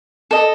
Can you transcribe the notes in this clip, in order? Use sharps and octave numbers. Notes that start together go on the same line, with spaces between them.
A4 D#5